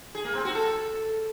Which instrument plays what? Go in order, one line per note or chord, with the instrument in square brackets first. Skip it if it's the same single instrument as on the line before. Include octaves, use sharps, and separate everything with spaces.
[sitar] G#4
A#3
C4
F#4
A4